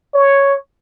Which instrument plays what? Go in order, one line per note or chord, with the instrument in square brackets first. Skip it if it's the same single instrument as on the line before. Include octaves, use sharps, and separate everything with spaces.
[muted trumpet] C#5